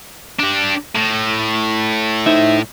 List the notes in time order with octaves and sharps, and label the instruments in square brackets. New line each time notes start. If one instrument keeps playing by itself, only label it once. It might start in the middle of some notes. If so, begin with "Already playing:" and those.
[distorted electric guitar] D4 G4
A2
[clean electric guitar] D#4 C5 E5